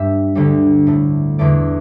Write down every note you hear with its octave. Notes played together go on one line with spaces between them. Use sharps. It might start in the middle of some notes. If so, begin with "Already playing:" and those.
Already playing: G2 G3 E5
D2 D3 G3
A2 A3
E2 D3 A3 D5